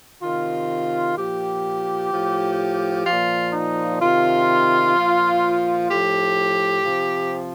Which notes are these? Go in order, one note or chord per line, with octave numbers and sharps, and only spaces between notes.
C3 D#3 F4
A#2 F3 G4
A2 F3
A#2 F3 F4
D#4
C3 D#3 F4
A#2 F3
A2 F3 G4
C3 F3